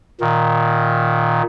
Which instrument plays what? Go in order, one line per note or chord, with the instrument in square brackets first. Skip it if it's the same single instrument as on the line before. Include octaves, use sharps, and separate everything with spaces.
[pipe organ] A#2 D#3